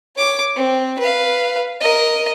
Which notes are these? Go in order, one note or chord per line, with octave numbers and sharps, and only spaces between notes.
C#5 D6
C4
B4 F5
A#4 D#5